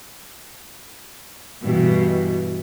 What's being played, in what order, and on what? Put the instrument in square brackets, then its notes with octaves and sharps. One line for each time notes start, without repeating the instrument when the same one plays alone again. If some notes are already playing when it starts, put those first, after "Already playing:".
[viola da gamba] G2 B2 E3